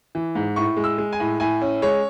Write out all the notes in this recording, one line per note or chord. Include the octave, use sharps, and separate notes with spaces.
E3
G#2
A2 C#6
G#3
E6
G#3
G#5
A2
A2 G#5
C#4
G#3 C#5